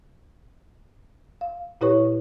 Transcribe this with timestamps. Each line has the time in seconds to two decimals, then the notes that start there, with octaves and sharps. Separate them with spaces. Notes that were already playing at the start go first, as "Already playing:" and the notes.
1.41 F5
1.81 A#2 E4 G4 B4 C#5 C#6